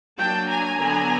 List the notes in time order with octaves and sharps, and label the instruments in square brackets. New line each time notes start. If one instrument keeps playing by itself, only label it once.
[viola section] F#3 A#3 D4 G5 A5
G#5 A#5
D3 F#3 B3 D4